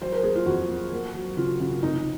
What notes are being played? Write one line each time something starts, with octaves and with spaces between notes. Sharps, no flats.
F#3 C5
A#4
A#3 G#4
F4
F2 F#4
A#3
A#3
F#3
C#3 F4
C#3
F1 D#4